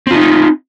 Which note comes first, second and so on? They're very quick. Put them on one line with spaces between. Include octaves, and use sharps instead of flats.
C4 F4 D#4